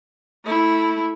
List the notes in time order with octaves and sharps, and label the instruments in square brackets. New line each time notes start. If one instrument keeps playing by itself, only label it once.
[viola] A3 E4